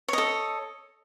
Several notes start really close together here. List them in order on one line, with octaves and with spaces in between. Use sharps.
C#5 D#5 A4